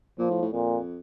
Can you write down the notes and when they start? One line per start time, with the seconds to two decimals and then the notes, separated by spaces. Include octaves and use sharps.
0.18 A#2 F3
0.30 A2
0.41 A2
0.53 F2 A#2